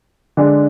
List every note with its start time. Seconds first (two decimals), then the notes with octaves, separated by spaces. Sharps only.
0.37 D3 G#3 D4